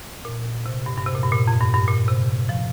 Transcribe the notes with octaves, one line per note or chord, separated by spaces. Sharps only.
A#2
C3
G2
G2
C3
A#2
G2
A#2
F2
G2
G2
A#2
C3
F3